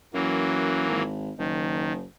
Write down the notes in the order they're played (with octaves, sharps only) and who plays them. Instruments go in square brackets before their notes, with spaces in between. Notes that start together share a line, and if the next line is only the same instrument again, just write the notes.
[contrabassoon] F#2 [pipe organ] E3 F#3 A#3
[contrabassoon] G#1
[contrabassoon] F#1 [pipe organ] D#3